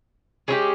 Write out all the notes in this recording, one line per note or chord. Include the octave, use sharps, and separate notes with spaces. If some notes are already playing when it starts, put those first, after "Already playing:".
G#3 C#4 E4 G4